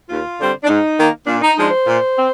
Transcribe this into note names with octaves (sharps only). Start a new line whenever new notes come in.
D#2 F4
D3 G3 C4
D4
G#2 D#4
D#3 A#3
A#2 D4
D#4
F3 G#3 D4 D#4
C5
A#2
C4